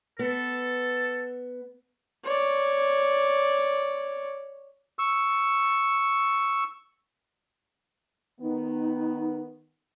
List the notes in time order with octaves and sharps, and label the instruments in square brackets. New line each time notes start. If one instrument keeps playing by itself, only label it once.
[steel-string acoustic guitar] B3 [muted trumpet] A4
[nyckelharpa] C#5 D5
[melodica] C#6 E6
[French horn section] D#3 B3 [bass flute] D#4